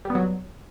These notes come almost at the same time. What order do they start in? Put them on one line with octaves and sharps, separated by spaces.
G3 B3 F#3